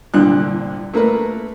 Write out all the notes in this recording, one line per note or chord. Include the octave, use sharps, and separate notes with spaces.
C2 A#2 D3 F#6
A3 A#3 A#4 B4